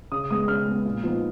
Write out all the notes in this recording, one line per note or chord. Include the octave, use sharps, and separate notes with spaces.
C#3 D#6
G#3 B3 D#6
C#3 F6
G#3 B3
A#2
F3 B3 D#4